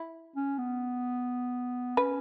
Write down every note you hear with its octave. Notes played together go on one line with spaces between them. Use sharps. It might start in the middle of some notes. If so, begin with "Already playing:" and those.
Already playing: E4
C#4
B3
C#4 B4